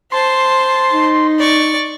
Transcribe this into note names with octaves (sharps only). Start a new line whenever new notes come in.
C5 A5 C6
D#4
D5 C#6